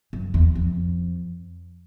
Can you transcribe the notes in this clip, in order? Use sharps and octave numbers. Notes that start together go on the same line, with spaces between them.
F#2
E2
F2